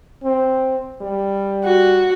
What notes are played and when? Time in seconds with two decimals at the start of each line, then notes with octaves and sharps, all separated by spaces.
0.23 C4
1.01 G3
1.65 F#4